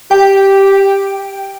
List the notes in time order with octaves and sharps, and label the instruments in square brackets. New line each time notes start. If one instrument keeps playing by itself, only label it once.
[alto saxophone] G4 [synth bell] G5